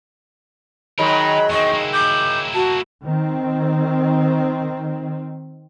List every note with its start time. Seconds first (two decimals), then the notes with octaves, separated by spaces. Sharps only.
0.99 D#3 F#3 G#3 D#4 A#4 B5
1.50 E2 C4 D#5 C#6
1.72 A#3 E4
1.93 D6 G6
2.54 F#4 A5
3.04 D#3 C4